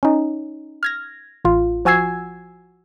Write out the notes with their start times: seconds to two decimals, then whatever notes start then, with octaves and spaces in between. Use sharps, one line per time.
0.03 C#4 D#4
0.83 F6 G#6 A#6
1.45 A1 F4
1.85 F3 F#4 G#5 E6 G#6 C7